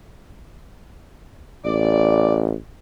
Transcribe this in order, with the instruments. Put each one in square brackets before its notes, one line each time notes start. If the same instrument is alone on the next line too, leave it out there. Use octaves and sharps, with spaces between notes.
[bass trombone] A1 [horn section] D5